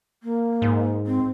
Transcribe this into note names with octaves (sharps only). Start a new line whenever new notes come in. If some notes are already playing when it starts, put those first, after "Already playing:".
A#3
G#2
C4